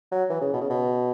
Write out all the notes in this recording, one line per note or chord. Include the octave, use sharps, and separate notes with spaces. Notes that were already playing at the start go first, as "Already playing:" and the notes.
F#3
E3
C#3
B2
C#3
B2